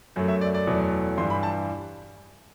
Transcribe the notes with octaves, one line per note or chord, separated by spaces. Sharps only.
F#2 F#3 A3
E5
D5
D5
E2 B2 F#3 A3
G2 E3 G3 C6
B5
A5